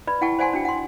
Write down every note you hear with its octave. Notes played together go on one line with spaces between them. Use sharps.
B4 D5 B5
E4 F#5 G5 A5 C#6
C5 D5 F#5 G#5 A5 C6
D4 F#4 G5
F#5 C6